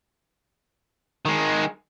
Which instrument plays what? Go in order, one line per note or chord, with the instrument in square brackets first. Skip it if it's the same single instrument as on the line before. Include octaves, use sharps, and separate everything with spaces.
[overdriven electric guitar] D#3 G#3